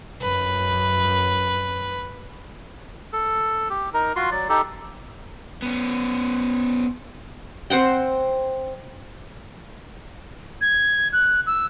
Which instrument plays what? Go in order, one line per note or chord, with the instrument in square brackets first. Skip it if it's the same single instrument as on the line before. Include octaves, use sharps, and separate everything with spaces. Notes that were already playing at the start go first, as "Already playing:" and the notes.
[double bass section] F#2 [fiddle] B4
[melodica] A4
G4
D#4 A#4
F4 F#4 C6
F#3 D5
D#4 G4 A4
[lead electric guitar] B3 C#4
[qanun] C4 C5 F#5 G5
[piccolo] G#6
F#6
E6